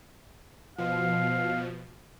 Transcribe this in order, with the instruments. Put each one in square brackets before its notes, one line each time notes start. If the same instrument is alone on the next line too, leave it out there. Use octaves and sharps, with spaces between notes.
[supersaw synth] B2 F3 [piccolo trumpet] F5